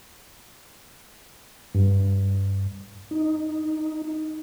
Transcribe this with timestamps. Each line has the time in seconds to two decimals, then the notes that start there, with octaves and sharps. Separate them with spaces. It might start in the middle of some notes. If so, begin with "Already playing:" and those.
1.75 G2
3.11 D#4